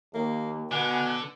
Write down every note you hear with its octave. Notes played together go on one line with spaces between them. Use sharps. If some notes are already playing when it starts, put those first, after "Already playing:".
D#2 A#3
B2 D3 B3 G#5 F#6